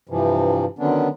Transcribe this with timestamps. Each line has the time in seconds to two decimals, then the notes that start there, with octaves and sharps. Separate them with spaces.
0.09 G2 C3 E3 F3
0.79 D3 D#3 F#3 B3 C#4 D4